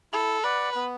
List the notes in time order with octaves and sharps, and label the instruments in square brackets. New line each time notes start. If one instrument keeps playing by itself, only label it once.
[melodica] E4 [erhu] A4
[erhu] B4 [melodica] D5 F#5
[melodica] B3